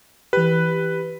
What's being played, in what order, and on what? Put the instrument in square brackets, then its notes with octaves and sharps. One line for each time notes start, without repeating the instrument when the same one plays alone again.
[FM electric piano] E3 G4 [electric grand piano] B4